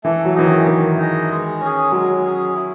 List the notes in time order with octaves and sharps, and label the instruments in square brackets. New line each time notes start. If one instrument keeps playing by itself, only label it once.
[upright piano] E3 [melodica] A3
[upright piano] F#3
[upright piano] E3 [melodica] D#4 G#4 D#5
[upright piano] D#3
[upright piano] D#3 [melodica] A3
[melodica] D#4 G#4 D#5
G#3
C#4
G#4
[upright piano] F#3 [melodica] G#3
[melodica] C#4 G#4
E4